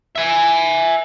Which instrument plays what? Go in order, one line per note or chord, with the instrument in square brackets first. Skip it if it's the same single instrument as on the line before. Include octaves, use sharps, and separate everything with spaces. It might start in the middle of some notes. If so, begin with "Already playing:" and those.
[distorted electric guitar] E5 G#5